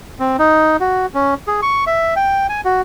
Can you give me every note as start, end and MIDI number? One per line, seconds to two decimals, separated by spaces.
0.20 0.36 60
0.39 0.77 63
0.80 1.06 66
1.14 1.34 61
1.47 1.61 68
1.62 1.84 85
1.87 2.14 76
2.16 2.47 79
2.49 2.61 80
2.65 2.81 66